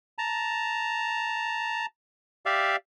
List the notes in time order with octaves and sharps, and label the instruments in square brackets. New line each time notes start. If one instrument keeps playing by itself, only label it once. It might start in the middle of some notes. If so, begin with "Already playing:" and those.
[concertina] A5 A#5
G4 D5 E5 F5